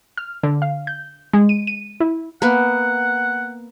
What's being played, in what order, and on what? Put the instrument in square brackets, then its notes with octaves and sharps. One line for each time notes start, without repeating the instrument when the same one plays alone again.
[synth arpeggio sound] F6
D3
F5
G6
G#3
D#7
D#7
E4
[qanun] A#3 B3 [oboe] F#5